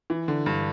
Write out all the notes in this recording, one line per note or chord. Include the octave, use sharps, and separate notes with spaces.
E3
D3
G2